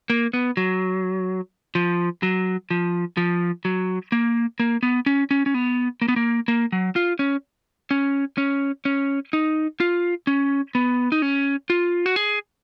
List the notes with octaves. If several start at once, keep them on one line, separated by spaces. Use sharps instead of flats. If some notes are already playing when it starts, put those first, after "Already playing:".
A#3
B3
F#3
F3
F#3
F3
F3
F#3
A#3
A#3
B3
C#4
C#4
C#4
B3
A#3
B3
A#3
A#3
F#3
F4
C#4
C#4
C#4
C#4
D#4
F4
C#4
B3
D#4
C#4
F4
F#4
G#4